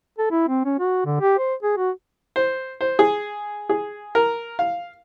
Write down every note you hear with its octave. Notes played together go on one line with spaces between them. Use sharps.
A4
E4
C4
C#4
F#4
D3
G4
C5
G#4
F#4
C5
C5
G#4
G#4
A#4
F5